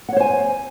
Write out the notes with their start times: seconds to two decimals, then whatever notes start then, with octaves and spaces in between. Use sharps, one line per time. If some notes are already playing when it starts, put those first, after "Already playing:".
0.09 F#5
0.13 C#5
0.17 C5
0.20 G#5